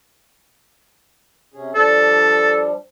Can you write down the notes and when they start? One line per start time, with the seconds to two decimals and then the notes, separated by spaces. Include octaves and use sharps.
1.54 C3 C#4 G#4
1.75 F3 G3 D4 A4